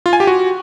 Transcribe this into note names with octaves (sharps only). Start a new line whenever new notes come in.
F4
G#5
G4
F#4